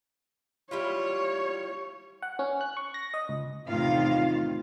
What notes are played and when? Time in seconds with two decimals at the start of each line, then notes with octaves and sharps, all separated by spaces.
0.71 G3 E4 F4 C#5
2.22 F#5
2.39 C#4
2.61 F#6
2.77 C#6
2.94 A#6
3.14 D#5
3.29 C#2
3.66 E2 A2 C3 D#3 F4 F5